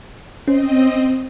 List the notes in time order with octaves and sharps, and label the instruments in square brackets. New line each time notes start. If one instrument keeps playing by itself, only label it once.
[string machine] C4 D#5 [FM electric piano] C#4 C5